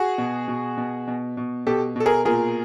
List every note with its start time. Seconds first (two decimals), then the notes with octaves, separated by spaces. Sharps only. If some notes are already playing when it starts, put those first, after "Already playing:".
Already playing: F#4 G#4
0.18 B2
0.48 B2
0.78 B2
1.08 B2
1.37 B2
1.67 B2 G4 A4
1.96 B2 A4
2.06 G#4 A#4
2.25 A#2 G#4 A#4